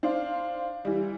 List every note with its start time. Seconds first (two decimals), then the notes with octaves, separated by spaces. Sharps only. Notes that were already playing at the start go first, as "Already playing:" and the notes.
0.03 D4 C5 F5
0.85 E3 G3